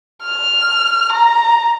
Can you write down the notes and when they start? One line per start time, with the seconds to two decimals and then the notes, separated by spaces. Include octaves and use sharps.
0.23 F6
1.12 A#5